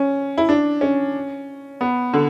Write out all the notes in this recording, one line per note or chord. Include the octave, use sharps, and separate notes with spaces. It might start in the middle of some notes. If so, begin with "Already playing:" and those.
Already playing: C#4
E4
D4
C#4
B3
D3